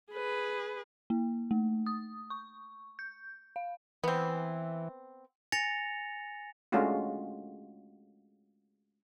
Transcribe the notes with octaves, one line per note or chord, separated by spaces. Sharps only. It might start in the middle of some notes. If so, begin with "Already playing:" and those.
G#4 B4
A#3
A3
D#6
C#6
G6
F5
E3 B3 C4
G#5 A6 A#6 C#7 F7
G#3 A3 C#4 D4 F4 F#4